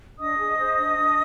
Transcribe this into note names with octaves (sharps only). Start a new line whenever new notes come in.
D4 D#5 D#6
G#4
C5
D4
D4